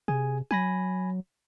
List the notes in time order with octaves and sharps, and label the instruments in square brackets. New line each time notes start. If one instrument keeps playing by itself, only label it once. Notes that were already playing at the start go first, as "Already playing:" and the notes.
[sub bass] C3 [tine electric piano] G#4 G#5
[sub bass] F#3 [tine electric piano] G#5 B5 A#6